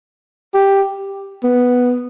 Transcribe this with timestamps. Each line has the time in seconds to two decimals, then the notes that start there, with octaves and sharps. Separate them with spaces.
0.54 G4
1.43 B3